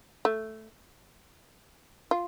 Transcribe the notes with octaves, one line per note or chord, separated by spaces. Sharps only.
A3
F4